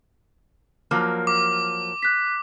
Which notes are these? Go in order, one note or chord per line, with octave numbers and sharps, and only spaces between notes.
F3 F#3 A#3 F6
D6
F#6 B6